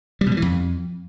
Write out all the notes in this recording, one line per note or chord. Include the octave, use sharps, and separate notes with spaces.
G3
B2
G3
E3
F2